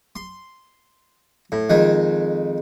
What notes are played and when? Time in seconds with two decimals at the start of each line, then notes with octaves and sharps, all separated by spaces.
0.16 C6
1.52 A2
1.69 F2 D#3 G#3